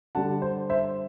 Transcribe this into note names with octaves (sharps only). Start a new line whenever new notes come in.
D3 G3 D4 F#5 A5
C5
C5 E5